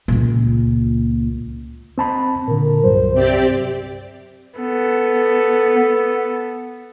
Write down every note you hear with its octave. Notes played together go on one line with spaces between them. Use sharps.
C#2 A#2
C4 A5 B5
A#2 D3 A#4
C2 G2 F#3 C5
C3 C4 G4 D5
B3 A4